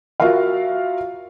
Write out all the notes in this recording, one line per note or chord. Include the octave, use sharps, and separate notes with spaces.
F4 F#4 A#4 E5 F5